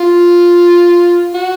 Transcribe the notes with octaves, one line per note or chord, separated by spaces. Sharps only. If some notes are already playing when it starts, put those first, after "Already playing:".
Already playing: F4
F#4